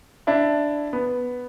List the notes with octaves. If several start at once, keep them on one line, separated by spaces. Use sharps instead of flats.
D4 E4
B3